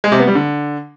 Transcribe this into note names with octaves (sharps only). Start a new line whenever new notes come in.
G#3
C3
B3
G3
D3